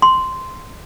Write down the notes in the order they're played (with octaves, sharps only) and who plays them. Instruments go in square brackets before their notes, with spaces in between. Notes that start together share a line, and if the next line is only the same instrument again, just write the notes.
[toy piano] C6